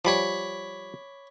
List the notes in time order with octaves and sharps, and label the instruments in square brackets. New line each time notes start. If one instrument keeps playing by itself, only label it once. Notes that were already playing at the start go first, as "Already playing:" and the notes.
[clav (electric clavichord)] F3 G3 [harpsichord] C#5 B5 D6